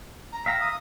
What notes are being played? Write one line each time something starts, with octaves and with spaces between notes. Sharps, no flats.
A#5
E5 F5 G5 A#5
D#6